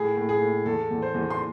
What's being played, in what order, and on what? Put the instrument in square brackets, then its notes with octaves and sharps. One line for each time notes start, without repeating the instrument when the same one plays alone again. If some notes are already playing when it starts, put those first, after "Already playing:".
Already playing: [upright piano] A2 G#4
A2
G#4
A2
E2 A4
E2
C5
E2
C6